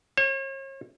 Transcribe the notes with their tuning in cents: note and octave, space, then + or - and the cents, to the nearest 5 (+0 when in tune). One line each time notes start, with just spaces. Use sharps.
C#5 -40